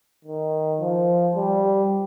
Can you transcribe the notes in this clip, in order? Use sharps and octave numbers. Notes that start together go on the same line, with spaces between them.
D#3
F3
G3